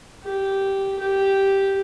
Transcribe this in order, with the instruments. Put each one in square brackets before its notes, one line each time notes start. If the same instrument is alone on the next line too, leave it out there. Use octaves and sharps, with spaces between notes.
[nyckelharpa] G4
G4